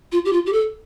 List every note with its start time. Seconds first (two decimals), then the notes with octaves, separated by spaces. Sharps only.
0.12 F4
0.25 G4
0.33 F4
0.46 G4
0.53 A4